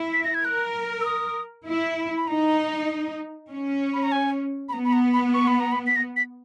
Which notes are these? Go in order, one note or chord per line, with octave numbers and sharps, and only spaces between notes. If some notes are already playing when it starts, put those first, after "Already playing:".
Already playing: E4
B6
A#6
G#6
A#4 F#6
E6
D#6
E4
B5
D#4 A#5
C#4
B5
A#5
G#5
B5
B3 A#5
B5
A#5
B5
C#6
B5
A#5
B5
B6
A#6
B6